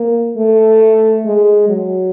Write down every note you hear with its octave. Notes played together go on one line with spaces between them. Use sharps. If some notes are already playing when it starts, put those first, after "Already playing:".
Already playing: A#3
A3
G#3
F#3